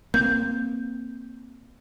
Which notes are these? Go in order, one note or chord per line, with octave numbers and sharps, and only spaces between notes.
A#3 C4 G6